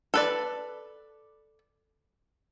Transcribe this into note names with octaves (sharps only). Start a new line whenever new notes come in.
A4 B4 D5